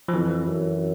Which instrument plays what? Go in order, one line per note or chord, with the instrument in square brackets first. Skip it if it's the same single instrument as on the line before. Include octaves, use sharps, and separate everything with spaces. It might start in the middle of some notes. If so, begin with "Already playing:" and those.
[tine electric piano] F3
[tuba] F2 [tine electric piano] E3
[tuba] F#2